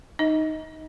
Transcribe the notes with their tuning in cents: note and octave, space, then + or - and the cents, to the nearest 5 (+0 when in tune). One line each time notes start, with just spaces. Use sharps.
D#4 +0 D#5 +25